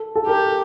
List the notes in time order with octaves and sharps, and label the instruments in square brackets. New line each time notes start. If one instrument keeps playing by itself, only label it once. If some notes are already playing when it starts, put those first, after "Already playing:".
Already playing: [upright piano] A4
A4
[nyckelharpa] G4 [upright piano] A#4